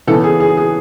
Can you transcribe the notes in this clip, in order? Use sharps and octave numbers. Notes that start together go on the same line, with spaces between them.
C#3 E3 B3 A4
G#4
G#4
G#4